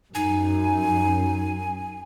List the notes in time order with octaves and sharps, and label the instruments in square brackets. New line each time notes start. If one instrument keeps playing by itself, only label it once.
[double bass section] F#2 [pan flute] D#4 [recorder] G#5